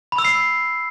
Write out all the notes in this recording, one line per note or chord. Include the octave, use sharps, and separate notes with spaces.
B5
E6
C7